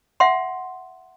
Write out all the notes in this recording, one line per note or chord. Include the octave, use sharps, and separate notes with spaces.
E5 F#5 C6